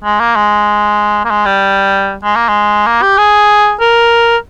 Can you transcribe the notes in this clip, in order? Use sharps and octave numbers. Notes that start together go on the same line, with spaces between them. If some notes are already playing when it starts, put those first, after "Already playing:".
G#3
A#3
G#3
A#3
G#3
G3
G#3
A#3
G#3
A#3
G4
G#4
A#4